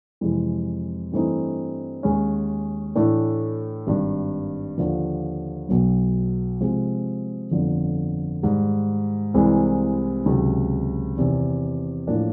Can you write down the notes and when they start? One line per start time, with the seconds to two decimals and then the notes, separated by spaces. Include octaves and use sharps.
0.21 F2 C3 E3 G#3
1.12 G2 E3 A3 C4 D#4
2.03 D#2 D#3 G#3 C#4
2.96 A2 E3 A3 D4
3.87 G#1 G2 D#3
4.78 D#2 D3 F3
5.69 B1 B2 F#3
6.61 C3 F3 G#3 C4
7.51 G1 F2 D3 F3
8.43 G#2 D#3 G3
9.34 C2 C3 E3 G#3 C4
10.26 C#2 C3 D#3 F#3
11.17 E2 C3 D#3
12.07 A2 F3 A#3 D4